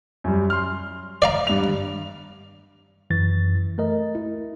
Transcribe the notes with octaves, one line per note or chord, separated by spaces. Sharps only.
F#2 G3
C6 F6
D5 F5 A#5
G2 F7
F#2 E3 A6
A3 A#4 D#5
E4